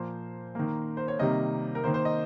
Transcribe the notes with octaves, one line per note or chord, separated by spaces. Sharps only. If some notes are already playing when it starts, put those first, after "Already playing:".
Already playing: A#2 F3 A#3 C5
D#3 A#3
C5
C#5
C3 D#3 G3 A#3 D#5
A#4
D#3 A#3 C5
C5
D#5